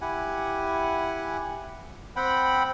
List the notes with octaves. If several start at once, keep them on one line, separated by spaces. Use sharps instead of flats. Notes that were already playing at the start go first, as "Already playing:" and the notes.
E4 G4 F#5 G#5
C4 F#5 G5 B5